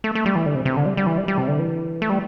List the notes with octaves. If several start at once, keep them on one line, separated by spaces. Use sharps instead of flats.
A3
A3
G3
E3
D3
C3
C3
D3
G3
G3
E3
G3
G3
C3
D3
E3
A3
G3